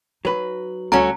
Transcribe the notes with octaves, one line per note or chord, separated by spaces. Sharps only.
F#3 D#4 B4
D2 G3 C#4 F#4 A4 A#5